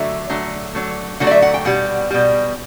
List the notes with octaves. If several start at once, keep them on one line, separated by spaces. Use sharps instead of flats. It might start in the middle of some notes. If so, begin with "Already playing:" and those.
Already playing: D3 F#3 A3 E5
D3 F#3 A3
D3 F#3 A3
D3 F#3 A3 F#5
D5
E5
F#5
G5
B2 G3 F#5
B2 G3